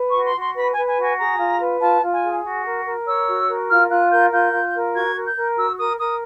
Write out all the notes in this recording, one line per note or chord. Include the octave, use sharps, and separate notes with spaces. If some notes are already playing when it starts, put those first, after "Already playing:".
Already playing: B4
F#4 C#6
C6
F#4 C6
B4 B5
B4 G#5
G#5
F#4 G#5
G#4 A#5
F4
B4
F4 A5
F4
G#5
G#4
F#4
A#4
A#4
C#5 E6
F#4
A#4
F4 F6
F4 F#6
A#4 G6
F4 G6
F4
A#4
F#4 G#6
A#4
G6
A#4
F#4 E6
A#4 D#6
A#4 D#6